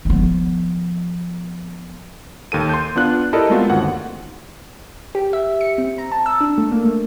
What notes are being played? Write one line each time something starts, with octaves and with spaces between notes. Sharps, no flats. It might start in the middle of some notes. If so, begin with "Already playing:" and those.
F3 B3
D#2 A4 D#7
C6 G6
B3 D4 F4 F#6
E4 G4 A4 A#4 D5 D#5
G#3 A3 B3 C4 F4 F#4
G1 D#2 F#5
G4
E5
C#7
C4
A#5
A5
E6
D4
A3
A#3
A3